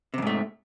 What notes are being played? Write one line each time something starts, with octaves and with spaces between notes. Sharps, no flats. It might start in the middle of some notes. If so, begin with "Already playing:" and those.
F2 G#2 C3 A3